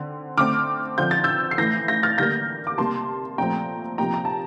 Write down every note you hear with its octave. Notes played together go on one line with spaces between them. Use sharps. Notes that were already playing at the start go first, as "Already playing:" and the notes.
Already playing: D3 C4
D3 A3 C4 D6 F6
D3 F3 C4 G6
A6
E6 G6
C7
A2 E3 A3 G6 A#6
G6 A#6
F6 A6
D3 G3 A#3 G6 A#6
D6
C3 G3 A#3 A5 C6
A#2 F3 A3 C4 G5 A#5
C3 F3 A#3 G5 A#5
A#5
A5